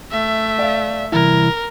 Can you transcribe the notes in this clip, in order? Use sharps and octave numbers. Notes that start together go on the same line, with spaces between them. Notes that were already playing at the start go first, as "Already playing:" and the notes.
A3 E5
D5 F5
C2 E3 E4 A#4